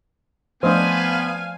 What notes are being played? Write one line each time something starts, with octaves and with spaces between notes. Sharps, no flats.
F3 A3 B3 D4 C5 D#5 F5 G#5